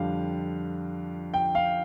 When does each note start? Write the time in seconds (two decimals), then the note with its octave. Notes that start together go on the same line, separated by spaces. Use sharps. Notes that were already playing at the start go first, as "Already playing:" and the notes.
Already playing: F2 D3 G3 F5
1.34 G5
1.55 F5